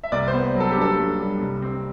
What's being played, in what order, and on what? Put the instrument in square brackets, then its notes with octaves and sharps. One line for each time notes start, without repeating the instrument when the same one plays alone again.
[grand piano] E5
C2 D5
C5
B3
F#3
A4
G4
G2 A4
G2
G3
C2
C4